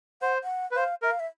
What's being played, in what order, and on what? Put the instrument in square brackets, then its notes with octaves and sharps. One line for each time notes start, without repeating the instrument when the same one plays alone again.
[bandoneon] C5 [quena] F#5
[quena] F#5
[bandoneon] B4
[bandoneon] C5 [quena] F5
[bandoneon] A#4 [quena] E5
[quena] F5
E5